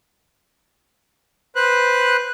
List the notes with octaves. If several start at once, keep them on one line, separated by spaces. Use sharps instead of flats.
B4 C5 F#6